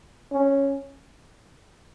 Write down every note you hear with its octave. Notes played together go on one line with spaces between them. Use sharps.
C#4